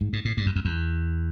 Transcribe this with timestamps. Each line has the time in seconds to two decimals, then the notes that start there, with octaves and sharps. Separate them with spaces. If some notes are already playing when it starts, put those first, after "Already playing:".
0.01 G#2
0.13 G#2
0.25 A2
0.37 G2
0.46 F#2
0.56 F2
0.65 E2